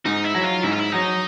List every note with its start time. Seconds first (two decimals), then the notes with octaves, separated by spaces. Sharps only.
0.05 G#2 D#4
0.25 E4
0.35 F#3
0.44 F4
0.63 G#2 E4
0.72 F4
0.80 E4
0.92 F#3 D#4